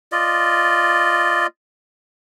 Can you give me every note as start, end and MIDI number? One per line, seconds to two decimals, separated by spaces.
0.12 1.47 65
0.12 1.47 74
0.12 1.47 75